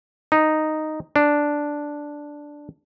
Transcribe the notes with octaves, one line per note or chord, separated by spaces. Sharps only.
D#4
D4